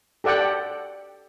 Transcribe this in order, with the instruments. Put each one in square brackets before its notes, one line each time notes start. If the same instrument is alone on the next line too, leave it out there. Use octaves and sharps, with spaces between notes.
[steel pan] G4 A4 D5 F#5 G5